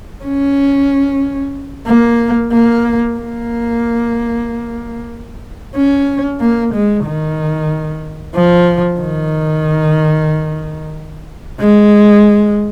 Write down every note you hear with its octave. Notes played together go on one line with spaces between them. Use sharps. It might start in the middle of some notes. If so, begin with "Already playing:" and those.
C#4
A#3
A#3
A#3
C#4
A#3
G#3
D#3
F3
D#3
G#3